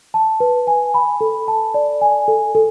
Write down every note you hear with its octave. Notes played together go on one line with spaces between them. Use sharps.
A5
B4
G#5
B5
A4
A5
D5
G#5
A4
A4